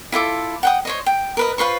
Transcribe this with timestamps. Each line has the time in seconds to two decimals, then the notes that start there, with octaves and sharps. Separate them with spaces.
0.12 E4 F4 A4 D6
0.63 F#5 G5 D#6
0.85 C5 C#5 D#5
1.06 G5
1.37 A#4 B4 D#5
1.58 F4 B4 C5 C#6